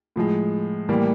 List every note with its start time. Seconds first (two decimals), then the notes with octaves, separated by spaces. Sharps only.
0.16 A2 F3 G#3
0.89 A2 E3 G3 A#3